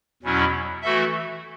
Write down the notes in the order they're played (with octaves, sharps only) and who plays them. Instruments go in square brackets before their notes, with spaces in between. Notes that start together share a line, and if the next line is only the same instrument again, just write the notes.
[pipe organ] E2 B2 F#3 C#4 E4
E3 A3 F#4 A4 E5